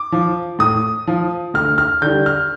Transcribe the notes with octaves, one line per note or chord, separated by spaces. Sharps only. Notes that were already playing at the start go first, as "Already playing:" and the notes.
Already playing: D6
F3
A2 D#6
F3
D2 F6
F6
D3 G3 G6
F6